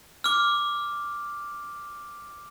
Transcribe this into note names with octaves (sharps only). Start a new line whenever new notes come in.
D6 F6